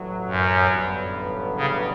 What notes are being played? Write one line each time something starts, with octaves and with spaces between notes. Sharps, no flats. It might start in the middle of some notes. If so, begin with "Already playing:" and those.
Already playing: A1 A2 F#3
F#2
A1 G2 D3 F#3 B3
C#3